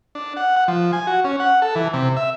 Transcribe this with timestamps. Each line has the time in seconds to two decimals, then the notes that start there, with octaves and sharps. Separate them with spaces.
0.15 D4
0.37 F#5
0.56 F#5
0.68 F3
0.93 G#5
1.07 F#4
1.24 C#4
1.40 F#5
1.62 A4
1.75 E3
1.94 C3
2.17 E5